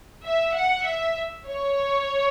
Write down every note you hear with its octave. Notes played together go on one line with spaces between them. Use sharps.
E5
F#5
E5
C#5